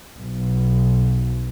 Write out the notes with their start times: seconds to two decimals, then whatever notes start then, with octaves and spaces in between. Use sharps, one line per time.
0.17 B1